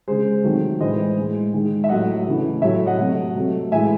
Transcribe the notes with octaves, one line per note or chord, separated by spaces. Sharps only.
C#3 G#3 G#4 C5
C3 D#3 F#3 A3
A2 E3 G#3 C5 D#5
A2 G#3
D#3 G#3
E5
A2 F#3 A3 D#5 F#5
C#3 E3 A3
A2 F#3 A3 C#5 E5
D#5 F#5
C3 F#3 A3
C3 F#3 A3
A2 E3 G#3 E5 G#5